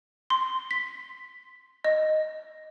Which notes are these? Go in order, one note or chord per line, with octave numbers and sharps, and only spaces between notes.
C6
B6
D#5